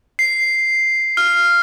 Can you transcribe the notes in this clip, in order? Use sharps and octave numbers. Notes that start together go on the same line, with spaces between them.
C7
F6